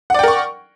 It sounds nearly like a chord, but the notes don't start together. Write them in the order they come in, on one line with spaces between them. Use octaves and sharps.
F#5 D5 G5 A#4 C#6